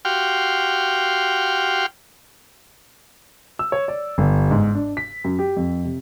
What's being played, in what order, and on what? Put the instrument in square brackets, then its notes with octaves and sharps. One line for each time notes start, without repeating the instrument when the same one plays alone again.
[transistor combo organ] F#4 G4 F5 G5 C6 F6
[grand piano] E6
C#5
D5
G1
G#2
D4
B6
F#2
G4
F2
C3